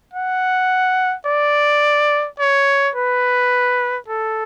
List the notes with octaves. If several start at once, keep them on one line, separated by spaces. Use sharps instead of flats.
F#5
D5
C#5
B4
A4